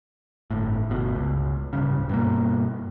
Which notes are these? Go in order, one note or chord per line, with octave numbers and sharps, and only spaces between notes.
G1 A2
G1 B2
C#2
D1 A#1 G2 C#3
G2 B2 A#3